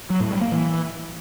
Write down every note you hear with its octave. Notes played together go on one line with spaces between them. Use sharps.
F#3
A2
G3
A#3
E3